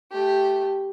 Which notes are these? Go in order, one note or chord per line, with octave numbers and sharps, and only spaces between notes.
A3 G4